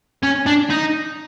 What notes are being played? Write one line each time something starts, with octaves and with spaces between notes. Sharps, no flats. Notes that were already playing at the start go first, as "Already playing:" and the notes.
C#4
D4
D#4